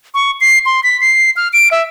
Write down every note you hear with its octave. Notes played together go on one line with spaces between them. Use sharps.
C#6
C7
C6
B6
C7
F6
D7
E5